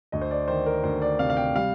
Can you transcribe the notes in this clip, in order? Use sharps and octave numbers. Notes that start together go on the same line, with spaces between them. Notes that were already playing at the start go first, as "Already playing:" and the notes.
D2 D#5
C5
D5
D#3 C5
A#4
D2 C5
D5
C3 F5
F5
G5
G3 F5